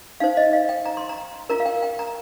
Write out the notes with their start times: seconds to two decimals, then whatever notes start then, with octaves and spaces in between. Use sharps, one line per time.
0.20 D#4 C5 F5
0.37 D#5
0.53 F5
0.69 G5
0.86 A#5
0.97 C6
1.09 A#5
1.49 F4 A#4 A#5
1.60 F5
1.66 G5
1.83 G5
1.99 A#5